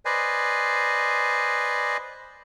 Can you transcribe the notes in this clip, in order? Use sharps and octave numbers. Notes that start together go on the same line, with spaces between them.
B4 C5 D5 D#5 G#5